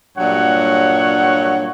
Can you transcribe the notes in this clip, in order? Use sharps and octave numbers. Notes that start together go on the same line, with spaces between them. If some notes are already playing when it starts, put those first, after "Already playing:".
G2 A#2 F#3 G3 C#5 F#5